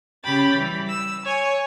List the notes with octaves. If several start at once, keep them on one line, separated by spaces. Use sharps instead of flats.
C#3 G4 G5 B5 A6
E3 G3
E6
C#5 G#5